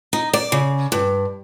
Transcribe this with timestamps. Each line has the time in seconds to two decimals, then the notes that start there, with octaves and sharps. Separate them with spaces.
0.13 D#4
0.33 D5
0.52 C#3
0.92 G2